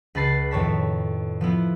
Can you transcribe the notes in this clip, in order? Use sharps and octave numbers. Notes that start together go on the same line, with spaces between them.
C#2 B4 A5 B5 A6 C7
F2 A2 D#3 C#5 A5 B6
F3 B3 E4 F4